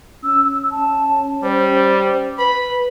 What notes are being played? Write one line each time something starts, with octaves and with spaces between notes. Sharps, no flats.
C#4 E6
A5
G3 C5
B4 B5